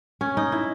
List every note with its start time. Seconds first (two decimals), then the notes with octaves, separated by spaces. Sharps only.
0.21 C#4
0.37 D#4
0.52 E4